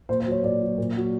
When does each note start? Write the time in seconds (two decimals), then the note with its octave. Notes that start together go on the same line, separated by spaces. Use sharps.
0.09 A#2 C5
0.20 C5
0.26 F#3
0.31 C#5
0.43 A#2 D5
0.61 F#3
0.78 A#2
0.96 F#3